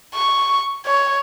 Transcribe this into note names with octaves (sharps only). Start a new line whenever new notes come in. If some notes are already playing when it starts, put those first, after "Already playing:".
C#6
C#5